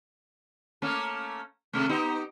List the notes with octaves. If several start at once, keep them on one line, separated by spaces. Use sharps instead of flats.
A3 A#3 C#4
C3 A3
B3 D#4 G4